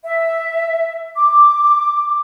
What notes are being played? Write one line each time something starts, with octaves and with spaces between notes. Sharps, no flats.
E5
D6